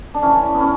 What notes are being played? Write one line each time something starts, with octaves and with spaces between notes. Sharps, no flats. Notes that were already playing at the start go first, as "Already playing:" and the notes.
D4
E3 C#4
B3
C#4